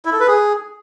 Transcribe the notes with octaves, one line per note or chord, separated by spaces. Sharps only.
E4
A4
B4
G#4